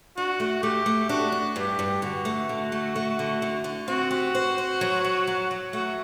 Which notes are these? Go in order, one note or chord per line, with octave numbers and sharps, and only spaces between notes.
D4 F#4
A3
A3 G4
A3
D4 F#4
D4
G2 G4
G2
D3 F#4
A3
D3
A3
A3
D3
D3
D3
C4 F#4
G4
C5
C5
F#3
F#3
F#3
F#3
A3 F#4